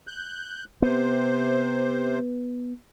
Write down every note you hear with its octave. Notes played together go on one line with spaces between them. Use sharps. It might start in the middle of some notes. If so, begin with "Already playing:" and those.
F#6 G6
C3 B3 C5